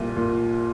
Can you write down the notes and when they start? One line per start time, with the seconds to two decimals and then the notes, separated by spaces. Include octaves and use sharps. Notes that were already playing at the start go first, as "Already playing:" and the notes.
Already playing: C2 A#2
0.16 A#2